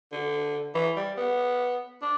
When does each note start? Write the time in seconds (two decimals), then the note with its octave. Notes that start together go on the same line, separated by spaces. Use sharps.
0.12 D3
0.74 E3
0.96 G3
1.17 B3
2.01 D4